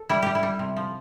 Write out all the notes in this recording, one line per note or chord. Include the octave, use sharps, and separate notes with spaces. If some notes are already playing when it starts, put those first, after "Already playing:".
Already playing: A4
G3 E4
G3 G4
E4
G3
C3
F3